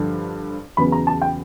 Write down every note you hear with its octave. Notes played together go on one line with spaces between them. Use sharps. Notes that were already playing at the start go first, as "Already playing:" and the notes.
Already playing: G2 D3 F3
E2 C#3 F#3 B3 B5
A#5
A5
G5